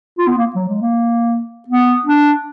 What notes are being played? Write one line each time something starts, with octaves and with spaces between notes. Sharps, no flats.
F4
B3
A#3
F#3
G#3
A#3
B3
D4